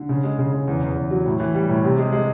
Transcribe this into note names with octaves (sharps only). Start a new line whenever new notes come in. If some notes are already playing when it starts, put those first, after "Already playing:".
Already playing: D3
C#3
G#3
C#3
C#3
E2
E2
E2
F#3
A2
E3
G3
A2
C3
G#3
G#3